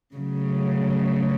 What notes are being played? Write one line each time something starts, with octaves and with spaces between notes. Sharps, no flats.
C#3 F#3 A3